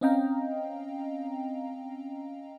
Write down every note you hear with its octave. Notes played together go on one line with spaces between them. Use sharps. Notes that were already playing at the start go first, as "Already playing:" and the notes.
C4 C#4 D#5 F5 G5 A#5